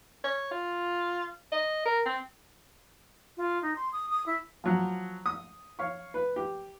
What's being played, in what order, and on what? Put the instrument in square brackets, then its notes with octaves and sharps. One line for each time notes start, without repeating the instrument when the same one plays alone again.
[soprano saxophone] C#5
F4
D#5
A#4
C4
[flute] F4
D#4
C6
D#6
D#6
E4
[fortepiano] F3 F#3
D#6
C#5 F5 C#6
B4
G4